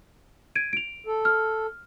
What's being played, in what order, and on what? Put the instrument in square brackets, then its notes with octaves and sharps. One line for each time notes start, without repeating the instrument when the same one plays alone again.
[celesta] G#6 D7 D#7
D7 F7
[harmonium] A4
[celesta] F6